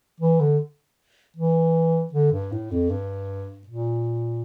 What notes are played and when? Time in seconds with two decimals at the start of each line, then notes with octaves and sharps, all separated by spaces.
0.20 E3
0.40 D3
1.36 E3
2.13 D3
2.32 G2
2.52 A2
2.71 F2
2.89 G2
3.67 A#2